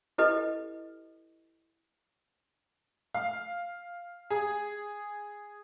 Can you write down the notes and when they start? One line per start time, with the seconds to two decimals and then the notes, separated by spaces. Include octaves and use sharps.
0.18 E4 G4 A4 B4 D#5
3.15 F5
4.30 G#4